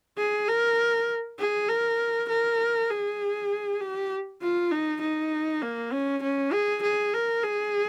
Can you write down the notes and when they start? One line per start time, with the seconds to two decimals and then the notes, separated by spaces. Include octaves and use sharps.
0.18 G#4
0.48 A#4
1.39 G#4
1.69 A#4
2.29 A#4
2.90 G#4
3.81 G4
4.41 F4
4.71 D#4
5.02 D#4
5.62 A#3
5.92 C#4
6.23 C#4
6.53 G#4
6.83 G#4
7.14 A#4
7.44 G#4